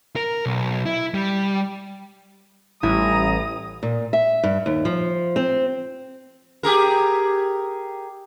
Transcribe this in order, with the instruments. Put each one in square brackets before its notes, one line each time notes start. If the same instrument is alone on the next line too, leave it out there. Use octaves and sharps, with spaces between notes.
[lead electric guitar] A#4
B1
E4
G3
[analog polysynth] A1 [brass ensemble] G3 G4 A#5 [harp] E4 [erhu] D#6
[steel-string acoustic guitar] A#2
E5
G2
D#2
F3
C4
[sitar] G4 G#4 A#4